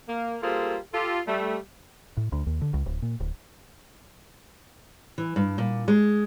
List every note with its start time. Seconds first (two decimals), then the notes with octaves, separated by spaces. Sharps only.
0.08 A#3
0.43 G3 A#3 F4 G#4 A4 C5
0.94 F4 G4 A4
1.27 G3 A3
2.17 A2
2.32 D2
2.46 D#2
2.62 D3
2.74 C#2
2.86 D1
3.02 A#2
3.20 D1
5.18 E3
5.36 G2
5.58 A#2
5.88 G#3